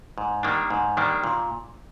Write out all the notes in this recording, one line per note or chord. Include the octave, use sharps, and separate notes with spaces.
G#2
D#3 G3 A#3 D4
G#2
D#3 G3 A#3 D4
A#2